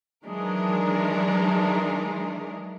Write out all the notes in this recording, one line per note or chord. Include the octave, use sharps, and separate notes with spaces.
D#3 E3 F#3 G#3 D4 A#4